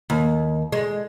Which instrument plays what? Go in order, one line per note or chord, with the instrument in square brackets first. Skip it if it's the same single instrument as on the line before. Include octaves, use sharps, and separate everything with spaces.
[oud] D#2
G#3